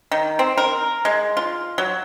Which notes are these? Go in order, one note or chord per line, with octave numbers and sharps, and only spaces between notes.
D#3
C4
A#4
G#3
F4
F#3